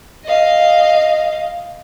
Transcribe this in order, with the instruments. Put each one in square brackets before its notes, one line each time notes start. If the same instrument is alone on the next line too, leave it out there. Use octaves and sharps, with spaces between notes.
[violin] D#5 F5